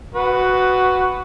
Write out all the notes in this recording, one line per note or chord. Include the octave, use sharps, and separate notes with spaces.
F#4 B4